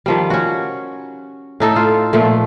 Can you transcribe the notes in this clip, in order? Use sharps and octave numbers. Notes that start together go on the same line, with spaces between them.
D#3 F3 G3
C#4 F#4
A2 D#4 A4
F4
A#2 F3 A3